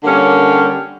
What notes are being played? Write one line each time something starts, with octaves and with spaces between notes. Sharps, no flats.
D3 G3 A#3 C#4